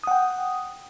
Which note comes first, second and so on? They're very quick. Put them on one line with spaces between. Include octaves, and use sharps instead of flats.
D#6 F#5 G5